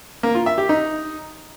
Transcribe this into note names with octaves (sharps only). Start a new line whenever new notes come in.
A#3
F4
E5
G4
D#4